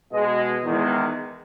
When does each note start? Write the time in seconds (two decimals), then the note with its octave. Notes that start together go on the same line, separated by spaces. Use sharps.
0.11 B2 G#3 D#5
0.63 E2 D#3 G#3